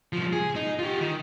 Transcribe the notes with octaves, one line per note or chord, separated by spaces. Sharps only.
C2 F3
G#4
D#4
F4 G4
D#3